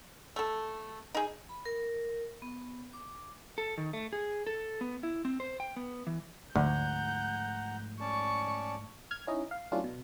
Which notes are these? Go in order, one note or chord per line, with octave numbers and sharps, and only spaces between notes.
A3 A4
D#4 G#4
B5
A#4
B3
D6
A4
D#3
A3
G#4
A4
B3
E4
C4
C5
G5
B3
E3
D2 G#2 F3 A3 F#5 A#5 G6
C#4 D5 A5 C#6
F6 G#6
C#4 D#4 E4 D#5
F5
F#3 A3 C#4 D4 E4 F4
B2